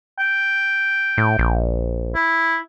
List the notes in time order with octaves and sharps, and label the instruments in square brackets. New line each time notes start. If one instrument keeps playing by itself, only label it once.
[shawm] G5
[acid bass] A2
A#1
[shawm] E4